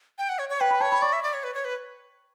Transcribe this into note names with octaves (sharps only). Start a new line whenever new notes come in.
G5
F#5
C#5
C#5
B4 G5
B5
C#5 A5
B5
D5 C#6
E5
D5
C#5
B4
C#5
B4